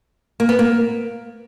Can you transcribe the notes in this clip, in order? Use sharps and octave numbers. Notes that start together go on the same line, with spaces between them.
A#3
B3
A#3